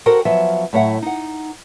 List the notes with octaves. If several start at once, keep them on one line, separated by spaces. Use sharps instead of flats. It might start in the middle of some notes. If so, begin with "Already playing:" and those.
F#4 A4 A#4 C5 G5
F3 F#3 B3 E5
A2 F#3 C#5 E5 F#5
D#4 F#5